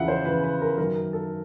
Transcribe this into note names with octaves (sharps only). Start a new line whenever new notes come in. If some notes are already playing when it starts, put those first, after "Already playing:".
Already playing: E2 C#3 F3 E5 F#5
C5
E2 C#3 F3 B4
B4
A#4
F#2 D#3 A#4
A4